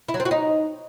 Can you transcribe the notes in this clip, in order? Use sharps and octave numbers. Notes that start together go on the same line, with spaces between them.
E4
F#3
C4
F#4
D#4